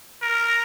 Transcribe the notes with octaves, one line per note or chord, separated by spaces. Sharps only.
A#4